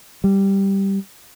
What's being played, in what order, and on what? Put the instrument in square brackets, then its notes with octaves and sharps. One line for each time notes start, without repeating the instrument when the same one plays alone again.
[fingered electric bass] G3